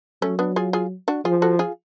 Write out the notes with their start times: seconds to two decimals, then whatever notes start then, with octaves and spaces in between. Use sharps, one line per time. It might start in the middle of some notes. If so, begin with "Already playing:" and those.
0.22 F#3 A3 C#4
0.39 B3 D4
0.56 F4 G#4
0.73 F4 G#4
1.08 D4 F#4
1.25 F3 F4 G#4
1.42 F#4 A4
1.59 F4 G#4